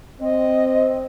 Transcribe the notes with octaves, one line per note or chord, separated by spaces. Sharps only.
C4 D#5